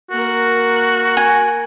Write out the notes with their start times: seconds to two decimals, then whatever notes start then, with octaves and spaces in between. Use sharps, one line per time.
0.11 A#3 F#4 A#4
1.17 G#5